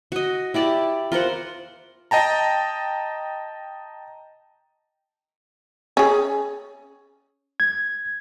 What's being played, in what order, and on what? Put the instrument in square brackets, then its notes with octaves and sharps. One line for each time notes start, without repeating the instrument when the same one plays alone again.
[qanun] F#4 D#5
E4 G4 D5 A5
F4 A#4 C5 F#5
[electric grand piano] D#5 G5 A5 A#5
[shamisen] C#4 G#4
[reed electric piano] G#6